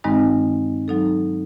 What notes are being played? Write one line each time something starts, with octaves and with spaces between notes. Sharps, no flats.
G2 D#3 G#3 C4 D#4
F#3 D#4 A4